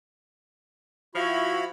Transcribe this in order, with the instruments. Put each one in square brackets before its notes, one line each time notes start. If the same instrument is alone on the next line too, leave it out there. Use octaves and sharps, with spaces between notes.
[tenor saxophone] F3 [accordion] E4 F#4 B5 [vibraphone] F5